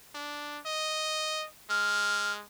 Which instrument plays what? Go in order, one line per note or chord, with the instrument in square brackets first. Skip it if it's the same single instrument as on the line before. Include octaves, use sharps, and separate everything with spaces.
[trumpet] D4
D#5
[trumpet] G#3 [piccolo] F6